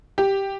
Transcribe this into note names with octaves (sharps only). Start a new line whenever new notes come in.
G4